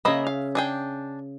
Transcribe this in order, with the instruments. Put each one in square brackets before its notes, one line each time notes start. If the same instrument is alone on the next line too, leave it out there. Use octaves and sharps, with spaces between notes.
[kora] C#3 E5 [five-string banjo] A#3 D#5 B5
[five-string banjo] F5
D4 G#4 G5